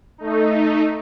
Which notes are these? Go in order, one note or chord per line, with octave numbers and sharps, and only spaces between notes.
A3 D#4